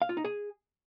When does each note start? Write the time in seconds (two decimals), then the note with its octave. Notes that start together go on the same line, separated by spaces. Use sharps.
0.02 F5
0.09 F4
0.17 D#4
0.25 G#4